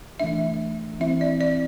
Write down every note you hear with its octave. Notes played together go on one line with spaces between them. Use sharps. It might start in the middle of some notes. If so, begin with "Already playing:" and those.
E3 A3 D4 E5
E3 C4 E4 E5
D5
D5